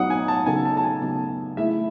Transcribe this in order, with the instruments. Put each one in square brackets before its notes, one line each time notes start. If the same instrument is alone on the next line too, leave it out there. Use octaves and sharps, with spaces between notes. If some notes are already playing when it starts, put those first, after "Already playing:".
Already playing: [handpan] F#3 B3 D#4 [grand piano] F#5 D#6
[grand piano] G#5
A5
[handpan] C#3 F#3 B3 D#4 A4 [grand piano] G#5
[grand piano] A5
A5
G#5
[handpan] C#3 F#3 B3 D#4 A4
[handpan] A3 E4 G#4 [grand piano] E5